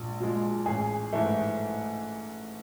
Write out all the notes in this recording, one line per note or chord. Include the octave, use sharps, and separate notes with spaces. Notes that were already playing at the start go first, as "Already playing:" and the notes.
Already playing: A#1 G#3
A#2 F3 G#3
A1 G#4
G#2 E3 A3